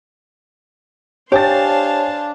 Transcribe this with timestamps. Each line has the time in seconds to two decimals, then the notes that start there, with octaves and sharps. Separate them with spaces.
1.32 D4 G4 C5 C#5 F5 G#5 A5 A6